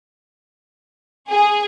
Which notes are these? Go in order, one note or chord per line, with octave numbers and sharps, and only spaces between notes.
G#4